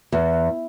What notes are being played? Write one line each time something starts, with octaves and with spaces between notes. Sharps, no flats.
E2